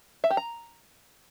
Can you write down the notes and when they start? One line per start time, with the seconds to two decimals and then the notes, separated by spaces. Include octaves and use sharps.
0.24 E5
0.30 G4
0.37 A#5